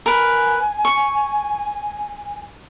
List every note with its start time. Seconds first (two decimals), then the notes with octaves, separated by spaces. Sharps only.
0.06 A#4 B4 G#5
0.85 C#6